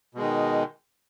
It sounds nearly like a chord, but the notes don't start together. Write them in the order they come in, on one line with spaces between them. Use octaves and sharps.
B2 G#3 D#3